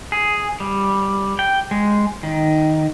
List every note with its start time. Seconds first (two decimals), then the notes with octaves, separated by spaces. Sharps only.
0.12 G#4
0.60 G3
1.39 G5
1.71 G#3
2.23 D#3